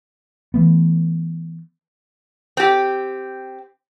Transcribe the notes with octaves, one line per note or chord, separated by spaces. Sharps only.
E3 A3 B3
C4 G4